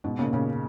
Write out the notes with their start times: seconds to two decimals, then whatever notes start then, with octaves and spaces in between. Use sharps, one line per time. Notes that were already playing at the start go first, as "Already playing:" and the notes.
0.04 G#2 B2
0.19 A#2 C#3
0.33 A#2 C#3